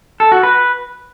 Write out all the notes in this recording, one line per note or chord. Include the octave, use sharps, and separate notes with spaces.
A4
F#4
B4